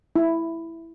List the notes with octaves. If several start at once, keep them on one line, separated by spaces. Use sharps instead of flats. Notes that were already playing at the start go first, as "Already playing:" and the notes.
E4